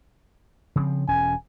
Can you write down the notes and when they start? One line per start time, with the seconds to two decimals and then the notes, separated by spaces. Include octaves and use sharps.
0.76 C#3 F3 C4
1.08 E1 C#4 G#5